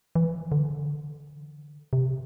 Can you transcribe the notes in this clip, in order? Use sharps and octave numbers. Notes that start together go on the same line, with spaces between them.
E3
D3
C3